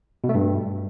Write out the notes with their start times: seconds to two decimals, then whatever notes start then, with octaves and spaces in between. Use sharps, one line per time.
0.24 B2
0.29 A3
0.35 G2